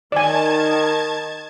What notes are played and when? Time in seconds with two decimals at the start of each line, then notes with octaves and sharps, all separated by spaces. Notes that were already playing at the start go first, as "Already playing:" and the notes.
0.12 D#3 D5 G#5 A5 G#6